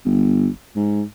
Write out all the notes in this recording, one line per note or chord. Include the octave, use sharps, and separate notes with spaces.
G1
G#2